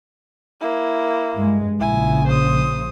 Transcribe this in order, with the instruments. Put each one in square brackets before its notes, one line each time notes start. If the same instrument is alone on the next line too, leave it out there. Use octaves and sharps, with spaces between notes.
[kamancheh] A#3 E4
[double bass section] G2 G#3
[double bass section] A#1 C#3 [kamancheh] E4 G#5
[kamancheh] C5 D#6